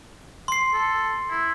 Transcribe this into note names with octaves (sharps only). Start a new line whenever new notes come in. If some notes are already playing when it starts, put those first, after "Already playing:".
C6 C7
A4
E4